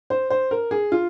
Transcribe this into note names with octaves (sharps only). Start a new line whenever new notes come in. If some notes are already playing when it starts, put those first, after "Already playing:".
C5
C5
A#4
G#4
F4